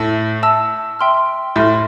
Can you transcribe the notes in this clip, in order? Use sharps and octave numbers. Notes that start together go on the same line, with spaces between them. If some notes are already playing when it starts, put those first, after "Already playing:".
Already playing: A2 E5 A5 E6
E5 A5 E6
E5 G5 C6 F6
A2 E5 G5 C6 F6